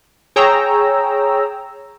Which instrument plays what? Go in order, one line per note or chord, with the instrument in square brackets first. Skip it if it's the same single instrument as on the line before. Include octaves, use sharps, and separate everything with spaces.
[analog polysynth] G#4 C#5 G5 A#5 E6